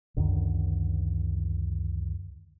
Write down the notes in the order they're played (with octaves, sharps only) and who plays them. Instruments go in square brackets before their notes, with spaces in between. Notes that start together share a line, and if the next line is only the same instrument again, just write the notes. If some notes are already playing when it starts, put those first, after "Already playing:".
[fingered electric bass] C#2 F#2 D3 D#3